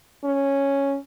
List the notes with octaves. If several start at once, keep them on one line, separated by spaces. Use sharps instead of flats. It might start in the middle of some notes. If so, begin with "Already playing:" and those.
C#4